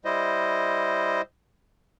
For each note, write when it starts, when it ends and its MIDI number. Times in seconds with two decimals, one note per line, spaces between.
0.05 1.21 55
0.05 1.21 64
0.05 1.21 72
0.05 1.21 75